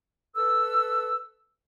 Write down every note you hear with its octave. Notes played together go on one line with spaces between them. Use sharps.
A4 B4 E6